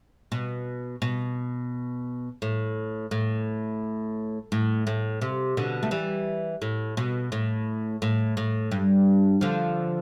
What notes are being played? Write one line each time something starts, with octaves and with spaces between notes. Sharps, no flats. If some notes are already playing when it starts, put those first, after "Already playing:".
B2
B2
A2
A2
A2
A2
C3
B2 D3
A3
E3 G3
A2
B2
A2
A2
A2
G2
D3 F3